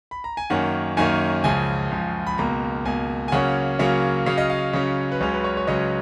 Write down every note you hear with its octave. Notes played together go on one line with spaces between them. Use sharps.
B5
A#5
G#5
F#2 D#3 A#3 C#4 F#5
F#2 D#3 A#3 C#4 G#5
C#2 C#3 F3 G#5
C#2 C#3 F3
B5
C#2 B2 A#3 A#5
C#2 B2 A#3 G#5
G#5
C#3 F#3 A#3 C#4 F#5
C#3 F#3 A#3 C#4
C#3 F#3 C#4 F5
D#5
F5
C#3 F#3 C#4
B4
C#2 C#3 F#3 C#4 C#5
B4
C#5
C#5
C#2 C#3 F#3 C#4 D#5